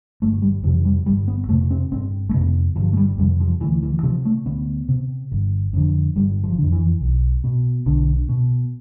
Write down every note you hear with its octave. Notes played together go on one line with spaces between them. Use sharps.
G1 A3
G3
F2 C3 E3
G3
G1 G3
B3
F2 C3 A3
C4
G1 C4
A3
F2 C3 B3
G1 F3
A3
G3
F2 C3 G3
F3
D2 E3
E3
C3 F3
A3
D2 B3
C3
G1
F2 D3
G1 G3
F3
F2 D3
E3
B1
B2
B1 D3
B2